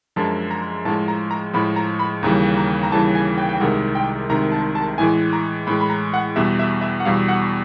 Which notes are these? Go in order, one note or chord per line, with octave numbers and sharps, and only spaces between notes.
F#2 D3 F3 G#3 A5
A#5
A2 F3 G#3 A5
A#5
A#5
A2 F3 G#3 B5
A#5
B5
D#2 C#3 E3 G3 A#5
A#5
A#5
D#2 C#3 E3 G3 A5
G#5
G5
G5
C2 C3 D#3 G#3 F#5
G5
C2 C3 D#3 G#3 A#5
A5
A5
A2 E3 G#3 G#5
A#5
A2 E3 G#3 B5
B5
A#5
F#5
E2 B2 G3 E5
E5
E5
F#5
E2 B2 G3 F5
F#5